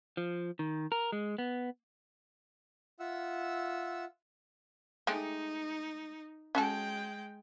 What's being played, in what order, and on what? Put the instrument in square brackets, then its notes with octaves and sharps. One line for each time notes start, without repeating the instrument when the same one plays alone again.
[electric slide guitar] F3
D#3
A#4
G#3
B3
[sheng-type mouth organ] F4 E5 F#5 E6
[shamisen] G#3 A3 G4 [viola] D#4
[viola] G#3 G5 [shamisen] C#4 F#4 A4